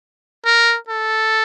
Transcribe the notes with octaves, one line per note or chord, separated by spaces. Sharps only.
A#4
A4